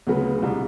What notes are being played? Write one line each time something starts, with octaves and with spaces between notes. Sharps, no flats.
D2 C#3 F#3 B3
C2 B2 G3